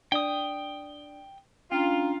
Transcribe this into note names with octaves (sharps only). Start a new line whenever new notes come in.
D4 D5 G5 D#6
C#4 D4 F4 G5 A#5